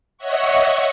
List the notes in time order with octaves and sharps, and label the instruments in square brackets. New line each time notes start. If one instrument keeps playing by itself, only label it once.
[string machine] C#5 D#5 E5 F#5 C#6